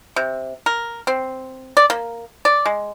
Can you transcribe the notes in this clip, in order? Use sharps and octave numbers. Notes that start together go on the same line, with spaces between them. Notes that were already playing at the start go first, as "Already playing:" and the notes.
C3
A#4
C4
D5
A#3
D5
G#3